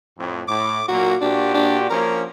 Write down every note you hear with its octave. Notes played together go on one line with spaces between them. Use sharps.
F2 A2
A2 D6
A#2 F#3 A#3 F#4
A#2 D4 F#4 G4
D4
F3 A#3 C#4 A#4